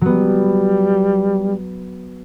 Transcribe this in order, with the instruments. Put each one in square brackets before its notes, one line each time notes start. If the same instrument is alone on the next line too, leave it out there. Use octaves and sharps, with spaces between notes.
[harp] F#3 B3 [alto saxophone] G3